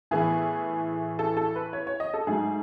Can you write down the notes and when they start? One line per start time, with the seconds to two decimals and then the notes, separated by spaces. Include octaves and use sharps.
0.11 A2 E3 B3 G#4
1.19 A4
1.37 A4
1.56 B4
1.73 C#5
1.87 C#5
2.00 D#5
2.14 A4
2.27 G#2 F#3 A3 G#4